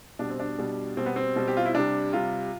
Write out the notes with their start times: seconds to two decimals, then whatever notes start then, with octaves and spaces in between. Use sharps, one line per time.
0.19 B2 G3 D4
0.30 C4
0.40 D4
0.58 B2 G3
0.97 B2 G3 C4
1.06 B3
1.16 C4
1.36 B2 G3
1.48 G4
1.57 F4
1.65 E4
1.74 C3 G3 D4
2.13 C3 G3 F4